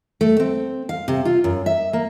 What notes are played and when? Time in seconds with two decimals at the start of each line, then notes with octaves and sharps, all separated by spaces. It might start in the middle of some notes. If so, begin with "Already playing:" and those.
0.21 A3
0.40 C4
0.89 F5
1.08 C3
1.25 F4
1.44 F#2
1.66 E5
1.93 A#3